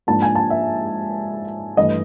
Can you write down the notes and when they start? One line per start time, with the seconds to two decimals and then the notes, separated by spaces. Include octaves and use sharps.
0.07 G#2 F3 A#3 D4 A5
0.22 G#5
0.35 A5
0.50 E5
1.77 G2 E3 A3 D#5